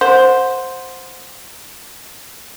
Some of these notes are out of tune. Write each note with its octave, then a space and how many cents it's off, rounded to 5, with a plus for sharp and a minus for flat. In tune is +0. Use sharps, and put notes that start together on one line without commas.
C5 +0 F#5 -20